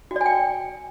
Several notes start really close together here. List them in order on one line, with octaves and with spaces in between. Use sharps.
F#4 D5 G#5 G5